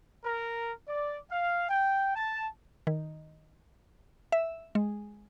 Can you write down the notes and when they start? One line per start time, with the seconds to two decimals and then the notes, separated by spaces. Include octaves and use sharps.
0.24 A#4
0.88 D5
1.31 F5
1.69 G5
2.16 A5
2.87 D#3
4.32 E5
4.75 G#3